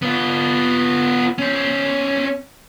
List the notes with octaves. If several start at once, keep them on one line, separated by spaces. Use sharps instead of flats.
B3 F4
C#4 C5